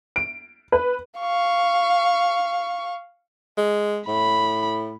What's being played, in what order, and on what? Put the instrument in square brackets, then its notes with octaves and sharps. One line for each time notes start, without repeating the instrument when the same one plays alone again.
[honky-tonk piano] D7
B4
[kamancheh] F5 C#6
[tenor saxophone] G#3
[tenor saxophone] A2 [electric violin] B5